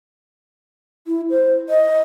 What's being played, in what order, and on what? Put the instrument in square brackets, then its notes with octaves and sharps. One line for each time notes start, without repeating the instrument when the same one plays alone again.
[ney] E4
C5
D#5